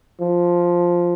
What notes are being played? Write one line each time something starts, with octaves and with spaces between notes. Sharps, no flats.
F3